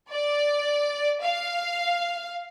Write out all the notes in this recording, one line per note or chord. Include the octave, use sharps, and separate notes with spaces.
D5
F5